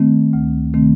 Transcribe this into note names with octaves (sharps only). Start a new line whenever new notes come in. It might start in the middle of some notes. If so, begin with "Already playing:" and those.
Already playing: D#3 A3 C4
D2
C3 D#3 A3 C4